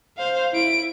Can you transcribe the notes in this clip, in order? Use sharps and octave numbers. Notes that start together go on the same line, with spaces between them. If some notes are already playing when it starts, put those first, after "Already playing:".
C5 F5
E4 D7